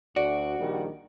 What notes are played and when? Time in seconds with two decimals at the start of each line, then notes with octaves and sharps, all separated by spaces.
0.16 D2 F#4 D5
0.59 A#1 D#3 G3